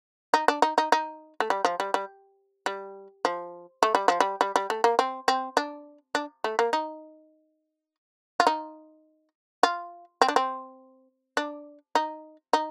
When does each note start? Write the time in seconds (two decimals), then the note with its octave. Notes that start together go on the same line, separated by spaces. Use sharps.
0.34 D#4
0.48 D4
0.62 D#4
0.78 D#4
0.92 D#4
1.40 A3
1.50 G3
1.65 F3
1.80 G3
1.94 G3
2.66 G3
3.25 F3
3.83 A3
3.95 G3
4.08 F3
4.20 G3
4.41 G3
4.56 G3
4.70 A3
4.84 A#3
4.99 C4
5.28 C4
5.57 D4
6.15 D4
6.44 A3
6.59 A#3
6.73 D#4
8.40 F4
8.47 D#4
9.63 F4
10.22 C4
10.28 D4
10.36 C4
11.37 D4
11.95 D#4
12.53 D#4